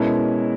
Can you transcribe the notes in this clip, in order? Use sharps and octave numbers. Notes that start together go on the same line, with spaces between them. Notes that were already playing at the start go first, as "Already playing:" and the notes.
Already playing: B2 G#3 C#4 E4 A#4